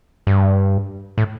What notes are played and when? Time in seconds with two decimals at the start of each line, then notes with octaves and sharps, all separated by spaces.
0.27 G2
1.18 A2